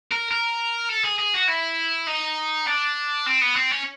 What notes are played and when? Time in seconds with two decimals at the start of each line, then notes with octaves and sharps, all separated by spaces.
0.11 A#4
0.31 A#4
0.90 A4
1.05 G#4
1.19 G#4
1.34 F#4
1.48 E4
2.08 D#4
2.67 D4
3.27 C4
3.42 B3
3.56 C4
3.71 C#4